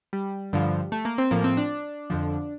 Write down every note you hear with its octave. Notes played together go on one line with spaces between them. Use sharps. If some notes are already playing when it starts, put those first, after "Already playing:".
G3
G2 D3 F3
A3
A#3
C4
A2 F3 A#3
C4
D4
F2 D3 F3